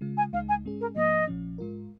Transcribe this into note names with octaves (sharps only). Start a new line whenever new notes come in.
C#3 G#3 F4
G#5
C#2 C#3 G#3 D#4 F5
G#5
G#2 G#3 C#4 G#4
A#4
G#2 F3 A#3 D#5
A#1 A#2 F3 C#4
G#2 G#3 F4 A#4